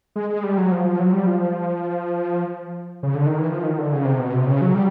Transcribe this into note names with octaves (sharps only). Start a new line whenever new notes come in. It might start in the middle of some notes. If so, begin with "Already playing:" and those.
G#3
G#3
G3
F#3
F3
F3
F#3
G3
F3
C#3
D3
D#3
E3
F3
D#3
D3
C#3
C3
B2
C3
C#3
F#3
G3